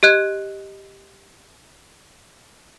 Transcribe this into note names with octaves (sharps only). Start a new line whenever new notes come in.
G4 D#5 F#6 G#6